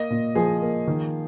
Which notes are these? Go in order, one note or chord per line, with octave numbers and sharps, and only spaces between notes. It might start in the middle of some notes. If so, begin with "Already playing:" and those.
Already playing: A#3 D#5
A#2
F3 G#4
A#3
D#3